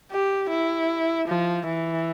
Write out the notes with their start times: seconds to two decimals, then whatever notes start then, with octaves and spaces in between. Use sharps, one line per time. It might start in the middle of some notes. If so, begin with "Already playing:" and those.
0.11 G4
0.51 E4
1.28 F3
1.67 E3